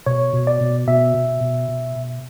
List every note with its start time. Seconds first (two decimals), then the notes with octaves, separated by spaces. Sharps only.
0.06 B2 C#5
0.33 B2
0.47 D5
0.61 B2
0.88 B2 E5
1.15 B2
1.41 B2
1.68 B2
1.96 B2